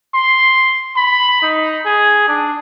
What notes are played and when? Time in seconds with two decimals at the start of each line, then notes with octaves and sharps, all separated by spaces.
0.14 C6
0.97 B5
1.42 D#4
1.86 G#4
2.28 D4